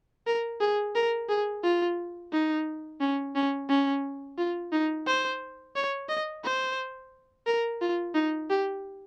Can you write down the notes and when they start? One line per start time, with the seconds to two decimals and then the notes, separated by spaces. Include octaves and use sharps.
0.27 A#4
0.61 G#4
0.95 A#4
1.29 G#4
1.63 F4
2.33 D#4
3.00 C#4
3.35 C#4
3.69 C#4
4.38 F4
4.72 D#4
5.07 C5
5.76 C#5
6.09 D#5
6.44 C5
7.47 A#4
7.81 F4
8.14 D#4
8.50 G4